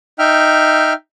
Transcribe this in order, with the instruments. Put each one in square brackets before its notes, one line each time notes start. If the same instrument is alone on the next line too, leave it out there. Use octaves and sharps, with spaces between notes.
[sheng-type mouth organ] D#4 E5 G5 F6